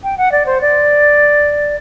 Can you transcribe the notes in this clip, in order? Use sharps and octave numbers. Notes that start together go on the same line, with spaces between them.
G5
F#5
D5
C5
D5